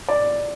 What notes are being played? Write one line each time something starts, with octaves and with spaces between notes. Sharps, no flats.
D5